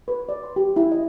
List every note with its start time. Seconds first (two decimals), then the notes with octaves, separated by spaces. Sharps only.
0.08 B4
0.29 D5
0.44 C6
0.56 G4
0.76 E4
0.92 D#5